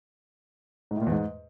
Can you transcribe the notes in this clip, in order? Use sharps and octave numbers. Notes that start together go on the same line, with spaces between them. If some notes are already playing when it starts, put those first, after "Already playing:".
G#2
A2
A#2
E2
G#2